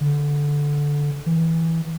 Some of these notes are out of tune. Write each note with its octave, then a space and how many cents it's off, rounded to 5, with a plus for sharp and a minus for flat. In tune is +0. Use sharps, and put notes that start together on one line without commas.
D3 -10
E3 -10